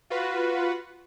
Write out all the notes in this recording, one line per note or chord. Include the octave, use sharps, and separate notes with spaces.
F4 F#4 B4